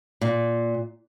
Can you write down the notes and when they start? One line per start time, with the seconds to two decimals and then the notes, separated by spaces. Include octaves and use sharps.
0.21 A#2